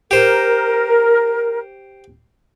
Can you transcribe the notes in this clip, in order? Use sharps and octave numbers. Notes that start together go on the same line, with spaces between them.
G4 A#4 C5